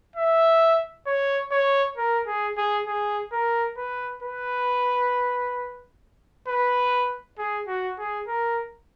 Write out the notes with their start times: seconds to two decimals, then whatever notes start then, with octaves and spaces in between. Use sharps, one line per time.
0.16 E5
1.07 C#5
1.52 C#5
1.97 A#4
2.27 G#4
2.57 G#4
2.86 G#4
3.32 A#4
3.77 B4
4.23 B4
6.48 B4
7.38 G#4
7.67 F#4
7.98 G#4
8.28 A#4